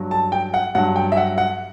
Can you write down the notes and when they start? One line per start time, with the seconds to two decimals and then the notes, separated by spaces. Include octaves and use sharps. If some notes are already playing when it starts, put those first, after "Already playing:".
Already playing: G2 F#3
0.11 A5
0.32 G5
0.54 F#5
0.75 G2 F#3 F#5
0.96 G5
1.12 E5
1.17 F#5
1.38 F#5